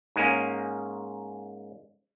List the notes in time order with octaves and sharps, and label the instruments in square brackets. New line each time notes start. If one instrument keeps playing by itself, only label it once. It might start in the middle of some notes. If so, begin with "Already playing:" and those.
[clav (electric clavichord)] G#2 G#3 A#3 C#4